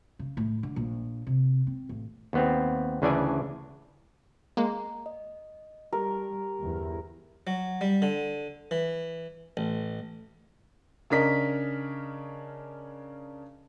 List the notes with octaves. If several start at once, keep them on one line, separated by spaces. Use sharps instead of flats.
C#3
A2
D3
A#1
C3
C4
A1
D#2 B3 C4
D2 C#3 E3 D4 D5 G#5
G#3 A#3 A#5
D#5
G3 G4 A#4
G1 E2
F#3
G3
D3
E3
A1
C#3 C#4 D4 A#4 D#5 B6